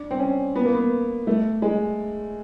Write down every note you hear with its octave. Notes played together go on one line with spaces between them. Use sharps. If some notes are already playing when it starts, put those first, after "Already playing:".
Already playing: D4
C4
C#4
B3
A#3
B3
A3
G#3